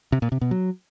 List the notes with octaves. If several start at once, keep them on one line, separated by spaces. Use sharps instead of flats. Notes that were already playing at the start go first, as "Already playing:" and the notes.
C3
A#2
C3
B2
F#3